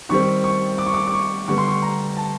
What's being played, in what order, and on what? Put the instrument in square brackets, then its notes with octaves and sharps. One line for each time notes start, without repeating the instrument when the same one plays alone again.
[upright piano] D#3 G3 C4 C#6
C#6
D6
C#6
D6
D6
C#6
D3 G3 B3 C#6
C6
C#6
A#5
A5